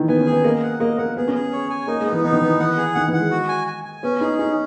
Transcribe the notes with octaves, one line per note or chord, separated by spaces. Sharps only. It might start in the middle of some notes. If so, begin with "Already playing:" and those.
Already playing: D#3 E3
B3 G#5
C#4
G#4
B3
A#3 D#5
F#5
A#3 D#5
A#3 F#5
B3 G#4
C#4
G#4
C#5
G#5
A#3 D#4
G#3
B3
E3
E3 D#4
D#3
E3 B3
E3 F#5
G#4
D#3 F#5
E3
F#5
G#3
F#4
G#5
G#5
G#5
B3 C#4
D#4 G#4
C#4 D#4